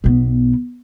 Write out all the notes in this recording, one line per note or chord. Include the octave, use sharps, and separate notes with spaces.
B1 B3